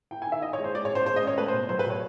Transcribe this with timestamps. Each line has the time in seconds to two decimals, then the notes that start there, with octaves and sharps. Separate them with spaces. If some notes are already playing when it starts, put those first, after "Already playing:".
0.11 E4 G5
0.22 G#5
0.26 D#3
0.32 E5
0.42 E4 D#5
0.53 C#5
0.58 G#3
0.64 C5
0.75 G#3 D5
0.85 C#5
0.91 C#4 C5
1.06 G#3 C5
1.16 D#5
1.22 C#4
1.27 C#5
1.38 A3 B4
1.48 C5
1.53 B2
1.69 F#3 C5
1.79 B4
1.85 B2
1.90 C#5